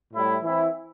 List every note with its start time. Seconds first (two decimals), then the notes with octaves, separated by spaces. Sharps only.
0.14 A2 G3 E4
0.43 E3 C4 E4